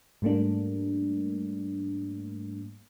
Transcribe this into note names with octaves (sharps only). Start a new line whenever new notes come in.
G#2 G3 A3 A#3 D4